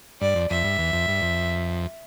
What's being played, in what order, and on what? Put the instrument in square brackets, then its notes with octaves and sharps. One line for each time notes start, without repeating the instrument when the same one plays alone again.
[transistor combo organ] G2 [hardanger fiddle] D5
[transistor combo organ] F2
[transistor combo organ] F2 [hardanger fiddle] E5
[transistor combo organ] G2
E2
F2
G2
F2